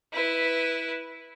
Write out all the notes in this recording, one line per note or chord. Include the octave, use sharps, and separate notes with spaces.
E4 B4